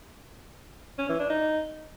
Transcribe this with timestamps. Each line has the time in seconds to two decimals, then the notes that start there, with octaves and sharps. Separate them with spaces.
0.98 C#4
1.09 E3
1.19 D4
1.30 D#4